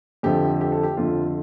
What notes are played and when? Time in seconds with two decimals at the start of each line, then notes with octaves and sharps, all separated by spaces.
0.23 F2 D3 F3 A3 G4
0.61 G4
0.72 A4
0.83 G4
0.97 F2 D3 F3 A3 F4